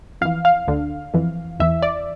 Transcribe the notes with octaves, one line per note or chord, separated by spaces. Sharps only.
F2 E3 F5
F5
D2 D3
F2 E3
E2 E3 E5
D5